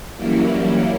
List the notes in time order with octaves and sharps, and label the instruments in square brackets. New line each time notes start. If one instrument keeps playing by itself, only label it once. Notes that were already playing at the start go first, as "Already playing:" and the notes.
[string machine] E3 F#3 G3 A#3 C#4 E4